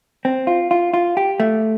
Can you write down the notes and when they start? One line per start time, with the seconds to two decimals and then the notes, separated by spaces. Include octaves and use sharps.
0.25 C4
0.47 F4
0.71 F4
0.94 F4
1.17 G4
1.40 A3